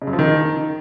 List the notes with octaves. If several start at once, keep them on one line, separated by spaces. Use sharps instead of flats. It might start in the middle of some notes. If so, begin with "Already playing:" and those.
C#3
F#2
F3
D#3